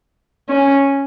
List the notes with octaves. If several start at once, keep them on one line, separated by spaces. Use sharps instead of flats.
C#4